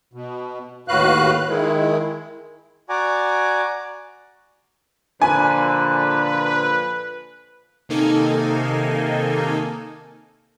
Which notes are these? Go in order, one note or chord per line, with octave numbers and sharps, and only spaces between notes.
B2
D#2 A2 F#4 B4 F5 F#6
D#3 G#3 E4
F#4 D5 F#5 G#5 A#5 D6
A#2 D3 F3 B4 G#5
C3 D#3 A#3 D#4 A4 G#5